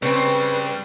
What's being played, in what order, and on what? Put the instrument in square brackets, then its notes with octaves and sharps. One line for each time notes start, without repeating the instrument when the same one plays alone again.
[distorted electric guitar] G2 G3 [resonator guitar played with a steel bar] C#3 C4 [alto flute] B4